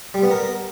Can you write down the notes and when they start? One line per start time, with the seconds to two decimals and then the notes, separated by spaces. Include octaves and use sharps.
0.14 G3
0.23 B3
0.31 A#4